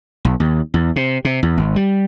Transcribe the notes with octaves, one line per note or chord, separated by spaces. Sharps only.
B1
D#2
E2
C3
C3
E2
G#1
G3